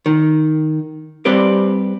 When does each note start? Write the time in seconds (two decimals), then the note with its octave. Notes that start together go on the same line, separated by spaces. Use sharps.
0.06 D#3
1.25 G3 C4 G4 B4 D5